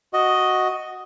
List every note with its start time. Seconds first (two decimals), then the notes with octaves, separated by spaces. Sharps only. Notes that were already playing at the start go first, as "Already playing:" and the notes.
0.13 F#4 D#5